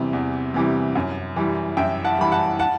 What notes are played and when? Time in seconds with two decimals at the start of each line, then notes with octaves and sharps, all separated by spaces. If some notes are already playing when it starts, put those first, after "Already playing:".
Already playing: E2 C3 E3 G3
0.13 E2
0.54 C3 E3 G3
0.95 F#2
1.36 E3 G3
1.77 F#2 E5 G5
2.04 F#5 A5
2.19 E3 G3 B5
2.32 F#5 A5
2.59 F#5 A5